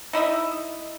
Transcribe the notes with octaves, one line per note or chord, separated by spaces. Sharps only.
D#4 E4 D#5 E5